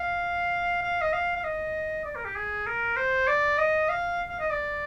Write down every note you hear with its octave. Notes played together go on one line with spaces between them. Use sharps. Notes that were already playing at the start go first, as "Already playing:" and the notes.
Already playing: F5
F5
D#5
F5
F5
D#5
D5
A#4
G4
G#4
A#4
C5
D5
D#5
F5
F5
D#5
D5